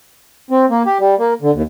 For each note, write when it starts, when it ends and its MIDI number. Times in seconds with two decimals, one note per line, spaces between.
0.51 0.65 60
0.70 0.83 58
0.86 0.98 67
0.99 1.15 55
1.19 1.34 58
1.42 1.51 50
1.54 1.62 39